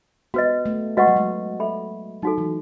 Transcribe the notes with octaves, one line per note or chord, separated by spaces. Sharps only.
B3 F#4 B4 D#5
A3
G#3 F#4 B4 D#5 F#5 C#6
F#3
G#3
A4 E5 B5
F#3 D#4 F#4 A4
E3